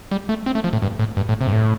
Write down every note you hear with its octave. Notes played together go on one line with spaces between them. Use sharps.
G3
A3
C4
A3
F3
A2
G2
A2
G2
A2
C3
G2
A2